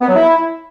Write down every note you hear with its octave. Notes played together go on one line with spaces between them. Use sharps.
B3
F#3
E4